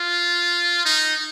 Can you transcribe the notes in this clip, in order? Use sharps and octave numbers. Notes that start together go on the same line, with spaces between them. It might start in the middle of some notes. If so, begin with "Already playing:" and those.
Already playing: F4
D#4